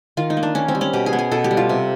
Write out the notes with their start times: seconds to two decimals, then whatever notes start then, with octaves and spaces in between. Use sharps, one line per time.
0.17 D#3 F4
0.30 D#4
0.37 A#3
0.43 D4
0.55 D#3 C#4
0.68 C4
0.75 G3
0.81 C#4
0.93 B2 G4
1.06 G#4
1.13 B3
1.19 G#4
1.31 B2 A4
1.44 G4
1.51 G3
1.57 F4
1.69 C3